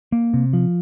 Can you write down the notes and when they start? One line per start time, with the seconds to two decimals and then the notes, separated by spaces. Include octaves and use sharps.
0.12 A#3
0.34 C3
0.53 F3